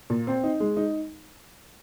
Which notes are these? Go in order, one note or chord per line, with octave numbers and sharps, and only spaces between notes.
A#2
C4
D#4
G#3
D#4